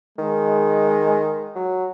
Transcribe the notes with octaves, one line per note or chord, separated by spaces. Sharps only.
D#3 G#3
F#3